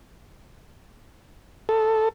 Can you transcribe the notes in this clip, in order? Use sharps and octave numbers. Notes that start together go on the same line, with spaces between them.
A4